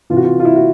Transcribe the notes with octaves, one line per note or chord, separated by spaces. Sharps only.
C3 E3 F4 F#4
F4
F4
E4
F#4